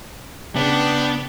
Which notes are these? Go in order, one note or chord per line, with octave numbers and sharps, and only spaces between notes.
C#3 B3 D4 G5